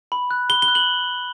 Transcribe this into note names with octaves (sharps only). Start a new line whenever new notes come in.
B5
F#6
B5 G7
G7
F#6
F#7